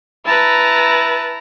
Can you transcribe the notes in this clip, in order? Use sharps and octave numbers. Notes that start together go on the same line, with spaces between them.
E4 B4 A5 A#5